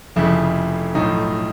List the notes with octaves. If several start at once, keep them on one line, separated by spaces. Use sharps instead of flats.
F1 F2 C#3 F3 E4
B1 A2 F3 D#4